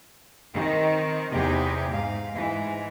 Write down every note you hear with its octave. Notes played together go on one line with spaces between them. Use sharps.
D#3 C4
E2 C3 D#4 G4 G#4
G#2 F5
G#2 E3